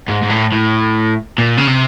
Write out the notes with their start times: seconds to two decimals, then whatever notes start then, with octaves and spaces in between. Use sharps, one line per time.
0.08 G#2
0.22 G#2
0.30 A2
0.52 A2
1.38 A#2
1.57 C#3
1.67 C3